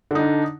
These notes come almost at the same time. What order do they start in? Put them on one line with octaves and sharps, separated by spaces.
D3 D#4 D4